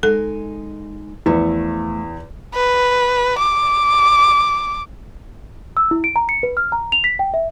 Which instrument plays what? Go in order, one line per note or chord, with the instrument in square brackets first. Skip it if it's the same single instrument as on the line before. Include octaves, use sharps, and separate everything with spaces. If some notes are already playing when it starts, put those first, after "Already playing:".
[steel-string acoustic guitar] G#3 D#4 G#5 [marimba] A4
[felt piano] E2 [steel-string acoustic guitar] F3 A3 E4
[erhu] B4
D6
[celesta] E6
E4
D7
A#5
C#7
B4
F6
A#5
F7
B6
G5
E5